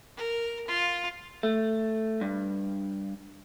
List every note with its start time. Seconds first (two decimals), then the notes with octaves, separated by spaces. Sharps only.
0.16 A#4
0.67 F4
1.43 A3
2.21 G2